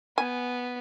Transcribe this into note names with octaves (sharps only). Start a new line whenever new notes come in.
B3 G#5